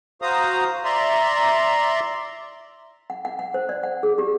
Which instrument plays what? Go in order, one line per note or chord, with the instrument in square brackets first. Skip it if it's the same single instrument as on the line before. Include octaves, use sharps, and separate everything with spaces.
[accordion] F#4 C5 F5 A#5 D#6
D5 E5 A#5 C6
[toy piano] F#5
F#5
F#5
C5
D5
F#5
G#4
G4